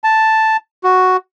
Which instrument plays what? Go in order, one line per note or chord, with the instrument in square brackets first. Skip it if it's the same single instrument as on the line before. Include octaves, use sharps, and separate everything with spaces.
[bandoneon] A5
F#4